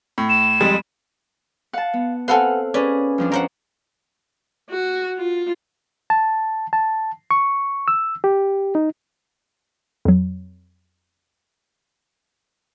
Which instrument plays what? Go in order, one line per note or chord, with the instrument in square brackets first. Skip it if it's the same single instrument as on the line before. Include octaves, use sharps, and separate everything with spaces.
[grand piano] A2
[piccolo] E7
[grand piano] F2 G3 G#3
[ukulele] F5 [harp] F#5 A5
[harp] B3
[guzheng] C4 A4 C6 [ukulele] B4 F#5 G#5 [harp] F5 F#6
[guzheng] C#4 [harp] G#4 B4 [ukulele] D5
[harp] F2 F3 D4
[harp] F3 [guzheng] A#4 C5 F#5 [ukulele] C#5
[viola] F#4
F4
[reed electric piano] A5
A5
C#6
E6
G4
D#4
[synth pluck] F2 F#3